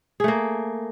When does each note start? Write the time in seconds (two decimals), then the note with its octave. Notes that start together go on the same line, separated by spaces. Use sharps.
0.20 G#4
0.24 A3
0.28 A#3